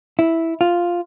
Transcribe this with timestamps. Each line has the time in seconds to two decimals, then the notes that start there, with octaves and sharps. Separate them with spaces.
0.19 E4
0.61 F4